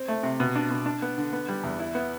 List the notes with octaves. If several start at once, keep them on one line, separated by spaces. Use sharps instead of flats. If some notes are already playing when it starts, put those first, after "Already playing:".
Already playing: C4
A3
C3
B2
D4
B2
D4
B3
D3
B3
G3
E2
E4
B3